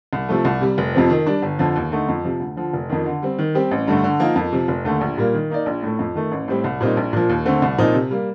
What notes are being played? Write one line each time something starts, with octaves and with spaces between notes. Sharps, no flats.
C2
C3 F3 A3
C2
C3 G3
F1
F2 C3 F3 C4
D#3
G3 D4
G1
F2 D3 F3
D#2
D3 A3 D#4
F2
C3 F3
D2
D3 F3
F1
F2 D#3
D3
G3 C4
D#3
G3 C4 G4
A1
G2 D3 A3
D3
F3 A#3 D#4 A#4
F2
C3 F3
F1
D#2 D3 A3
A#1
A#2 G3 A#3
D#3
A#3 D#4 A#4 D5
A#1
A2 A3
F2
D#3 A3
A1
A2 G3 C4 G4
C2
A#2 G3 C4 D#4
A#1
A#2 F3
D#2
D3 A3 C4
C2
A#2 F3 C4 D#4
C3
G3 A#3